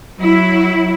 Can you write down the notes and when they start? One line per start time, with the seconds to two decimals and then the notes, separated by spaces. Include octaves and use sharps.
0.20 F#3 E4